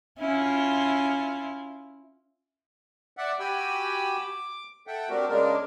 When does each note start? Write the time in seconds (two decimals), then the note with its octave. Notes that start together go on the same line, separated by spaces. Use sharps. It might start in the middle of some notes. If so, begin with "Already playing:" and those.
0.19 C#4 E4 F4
3.17 D5 E5 F#5
3.40 F#4 G4 G5 G#5 B5 E6
4.17 D6
4.87 A4 E5 F#5 G5
5.10 A3 C4 D4 F#4 G4 A#4
5.29 C#3 G#3 A#3 D4 A#4